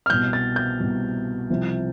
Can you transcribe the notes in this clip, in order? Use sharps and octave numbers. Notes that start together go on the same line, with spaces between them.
F6
C2 B2 G6
A6
G6
C2 B2
C2 C3 F3